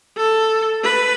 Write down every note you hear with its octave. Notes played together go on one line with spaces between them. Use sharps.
A4
B4